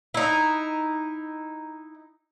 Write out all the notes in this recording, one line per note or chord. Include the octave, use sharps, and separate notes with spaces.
D#4 E4